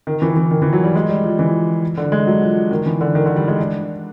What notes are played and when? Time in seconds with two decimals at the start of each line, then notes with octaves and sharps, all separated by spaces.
0.07 D#3
0.22 E3
0.36 E3
0.51 D#3
0.62 E3
0.73 F#3
0.84 G3
0.95 G#3
1.10 G3
1.24 F3
1.39 E3
1.97 D3
2.12 G#3
2.27 F#3
2.42 F3
2.71 D#3
2.86 E3
3.01 D3
3.15 D#3
3.26 D3
3.36 G3
3.48 G#3
3.59 D4